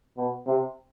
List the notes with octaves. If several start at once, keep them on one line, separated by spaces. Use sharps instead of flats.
B2
C3